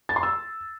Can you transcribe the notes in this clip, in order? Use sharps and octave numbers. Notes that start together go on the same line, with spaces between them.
A6
C6
E6